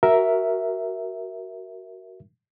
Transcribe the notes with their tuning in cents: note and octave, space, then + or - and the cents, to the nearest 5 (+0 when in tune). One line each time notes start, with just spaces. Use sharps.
F#4 +15 A#4 +0 E5 +0